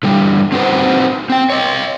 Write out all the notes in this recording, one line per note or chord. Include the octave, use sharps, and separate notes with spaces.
D3 E3 G3
C4 D#4 F#4 G4 B4 C5
C4 G5
C#5 D#5